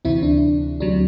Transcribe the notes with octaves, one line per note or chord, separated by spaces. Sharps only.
D2 C3 E3 C4 E4
D4
D2 C3 F#3 D4